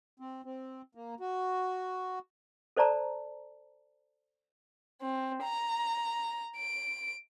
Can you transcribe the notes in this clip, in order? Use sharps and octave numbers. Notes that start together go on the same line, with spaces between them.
C4
C4
A#3
F#4
A4 C5 D5 A5 A#5
C4
A#5
D7